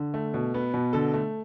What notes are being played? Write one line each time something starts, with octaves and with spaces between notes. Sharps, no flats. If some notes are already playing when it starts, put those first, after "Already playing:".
Already playing: D3
A3
B2
B3
B2
D3 A4
A3